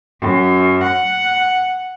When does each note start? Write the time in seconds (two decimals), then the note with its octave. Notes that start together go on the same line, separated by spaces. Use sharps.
0.21 F#2
0.83 F#5